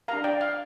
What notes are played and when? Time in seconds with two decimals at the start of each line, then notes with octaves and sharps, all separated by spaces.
0.08 D4 G4 A#4 F5 A#5
0.24 D5 G5
0.41 F5